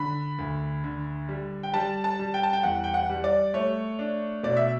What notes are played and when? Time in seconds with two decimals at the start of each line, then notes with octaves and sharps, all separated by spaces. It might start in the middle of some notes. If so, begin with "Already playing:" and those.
Already playing: D3 B5
0.39 D2
0.84 D3
1.29 G3
1.63 G5
1.73 G3 A5
2.04 A5
2.19 G3
2.34 G5
2.43 A5
2.53 G5
2.63 E2 F#5
2.84 G5
2.94 F#5
3.09 G3
3.24 D5
3.54 A3 C#5
3.99 D4
4.43 B2 D5
4.57 E5